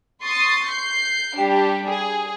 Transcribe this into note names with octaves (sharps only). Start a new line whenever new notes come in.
C6 C#6 D#6 A6
G6 C7
G3 D4 G4
G#4